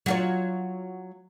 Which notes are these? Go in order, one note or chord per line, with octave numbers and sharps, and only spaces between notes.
F#3 F4 C#5